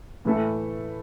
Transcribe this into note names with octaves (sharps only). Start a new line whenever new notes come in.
A2 E3 A3 E4 A4